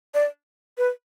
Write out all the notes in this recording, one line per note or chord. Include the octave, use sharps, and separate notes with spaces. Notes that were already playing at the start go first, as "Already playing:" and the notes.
D5
B4